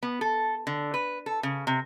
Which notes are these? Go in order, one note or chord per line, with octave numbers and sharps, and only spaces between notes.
B3
A4
D3
B4
A4
C#3
C3